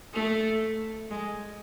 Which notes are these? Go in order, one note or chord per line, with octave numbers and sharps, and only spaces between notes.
A3
G#3